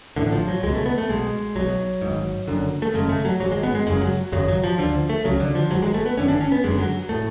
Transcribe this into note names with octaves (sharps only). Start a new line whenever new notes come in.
A1 A2 D3
F3
F#3
C#2 B2 G#3
A3
B3
A3
B1 B2 G#3
B1 B2 F#3
G#1 G#2
F#1 F#2 D3
A3
G#1 F#2 C#3 G#3
A3
F#3
G#1 G#2 F#3
G#3
B3
G#3
F#1 F#2 C#3 G#3
F#3
G#1 F#2 C#3 F#3
F#3
F3
D2 D3 F3
A3
C#2 C#3 F#3
D3
F3
G#1 G#2 F#3
G#3
A3
B3
G#1 F#2 D3 C#4
D4
C#4
B3
F#1 F#2 D3 G#3
F#3
A2 A3